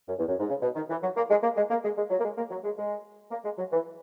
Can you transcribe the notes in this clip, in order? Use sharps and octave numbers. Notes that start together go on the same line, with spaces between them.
F#2
E2
F#2
G#2
C#3
B2
D#3
E3
F#3
A#3
G#3
A#3
G#3
A#3
G#3
G#3
F#3
A#3
G#3
A#3
F#3
G#3
G#3
A#3
G#3
F#3
E3